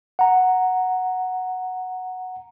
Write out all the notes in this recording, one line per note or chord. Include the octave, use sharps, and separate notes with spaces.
F#5 A#5